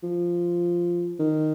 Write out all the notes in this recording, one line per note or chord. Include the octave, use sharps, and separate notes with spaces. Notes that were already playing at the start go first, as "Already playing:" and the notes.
F3
D#3